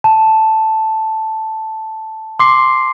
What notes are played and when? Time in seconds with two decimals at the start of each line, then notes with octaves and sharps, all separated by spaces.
0.04 A5
2.39 C6 D6 C7